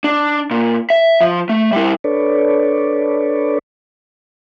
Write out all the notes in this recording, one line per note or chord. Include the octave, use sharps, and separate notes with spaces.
D4
A#2
E5
F3
A3
G3 E4
D4 A4 B4 C#5 D5